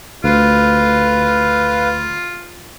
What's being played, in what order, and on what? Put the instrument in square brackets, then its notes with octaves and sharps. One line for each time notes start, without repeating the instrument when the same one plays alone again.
[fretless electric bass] D2 [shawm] F4 [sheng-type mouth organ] B4 F5